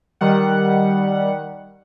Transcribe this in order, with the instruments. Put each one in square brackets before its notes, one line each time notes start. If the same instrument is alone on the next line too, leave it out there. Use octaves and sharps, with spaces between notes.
[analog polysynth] D#3 G3 F#5